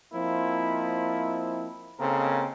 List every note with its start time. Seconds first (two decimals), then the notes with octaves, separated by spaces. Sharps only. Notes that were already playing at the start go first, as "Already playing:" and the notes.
0.14 F3 A#3 C4 D#4 E4
1.99 C#3 A#3 C4 D#4 A4 A#4